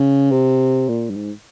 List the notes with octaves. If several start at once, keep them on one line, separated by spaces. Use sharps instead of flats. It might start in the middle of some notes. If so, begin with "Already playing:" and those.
Already playing: C#3
C3
A#2
G2
G#2